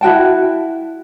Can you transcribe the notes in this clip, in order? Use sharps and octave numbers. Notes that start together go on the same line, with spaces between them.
E4 F#4 G5 A5